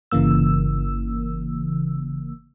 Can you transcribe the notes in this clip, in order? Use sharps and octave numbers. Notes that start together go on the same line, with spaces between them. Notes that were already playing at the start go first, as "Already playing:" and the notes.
G1 C#3 E3 A#3 E6